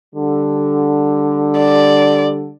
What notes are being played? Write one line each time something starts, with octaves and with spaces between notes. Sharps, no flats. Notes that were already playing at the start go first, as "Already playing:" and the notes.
D3 G3
D5